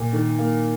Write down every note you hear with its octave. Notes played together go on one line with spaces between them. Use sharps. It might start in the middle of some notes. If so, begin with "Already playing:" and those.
Already playing: A#2
D#3
A#3